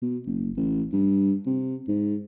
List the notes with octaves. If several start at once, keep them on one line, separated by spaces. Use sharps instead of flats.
B2
F#1
A1
G2
C3
G#2